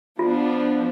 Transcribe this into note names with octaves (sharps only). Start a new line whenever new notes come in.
F3 B3 D4 F4